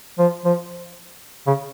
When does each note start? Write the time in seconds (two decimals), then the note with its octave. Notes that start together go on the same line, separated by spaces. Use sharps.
0.18 F3
0.45 F3
1.47 C#3